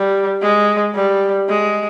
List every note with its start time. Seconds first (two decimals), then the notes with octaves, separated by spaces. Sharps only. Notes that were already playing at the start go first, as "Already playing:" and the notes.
Already playing: G3
0.41 G#3
0.95 G3
1.48 G#3